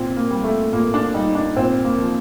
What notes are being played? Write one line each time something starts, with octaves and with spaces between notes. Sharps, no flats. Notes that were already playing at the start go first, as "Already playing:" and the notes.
Already playing: A#2 C4
A#3
G3
A3
A#2 A#3
D4
G3 D#4
D4
A#2 C4
A#3
F3